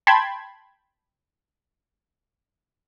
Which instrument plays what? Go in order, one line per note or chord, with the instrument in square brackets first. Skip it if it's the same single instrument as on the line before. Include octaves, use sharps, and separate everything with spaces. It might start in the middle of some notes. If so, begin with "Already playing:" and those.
[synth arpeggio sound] G5 A5 B5 C6 G#6